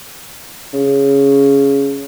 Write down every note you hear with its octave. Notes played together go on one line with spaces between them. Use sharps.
C#3